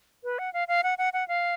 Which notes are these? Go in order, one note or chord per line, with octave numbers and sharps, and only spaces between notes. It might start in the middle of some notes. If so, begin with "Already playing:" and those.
B4
F#5
F5
F5
F#5
F#5
F#5
F5